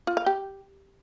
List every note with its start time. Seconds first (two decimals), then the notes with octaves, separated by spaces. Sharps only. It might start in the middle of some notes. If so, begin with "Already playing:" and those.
0.07 F4
0.17 F5
0.26 G4